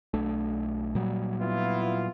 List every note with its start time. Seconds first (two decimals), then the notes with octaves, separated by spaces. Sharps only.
0.14 B1 A3 D4
0.95 A#2 F#3 G3
1.40 B3 E4 F4